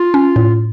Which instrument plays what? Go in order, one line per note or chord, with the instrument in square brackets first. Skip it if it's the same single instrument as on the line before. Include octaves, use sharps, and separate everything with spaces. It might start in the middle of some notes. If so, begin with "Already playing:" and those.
Already playing: [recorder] F4
[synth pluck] C#4
A2